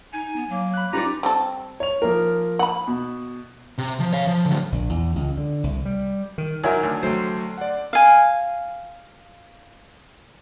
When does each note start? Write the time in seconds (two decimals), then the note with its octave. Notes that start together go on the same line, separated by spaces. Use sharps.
0.13 D#4 G#5
0.36 B3
0.49 F#3 A#3
0.74 B5 F#6
0.93 G3 C#4 D#4 F4 B4 D5 A#5
1.23 G3 C4 A4
1.80 C#5 F7
2.02 F3 A#3 A#4
2.59 F#5 B5 F#7
2.88 B2
3.78 C3
4.00 F3
4.13 C#5 F5
4.27 F3
4.46 D3 F#3
4.72 A#1
4.90 E2
5.16 C#2
5.38 D3
5.64 C2
5.85 G3
6.38 D#3
6.64 D#3 F#3 E4 A#4 G#5
6.83 D2
7.03 F#3 A3 C5 G5
7.58 D5 F#5
7.93 F5 G#5